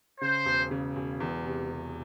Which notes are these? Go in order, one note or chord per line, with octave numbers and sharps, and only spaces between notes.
C#3 C5
E1
C#3
E1
E2
C3
C3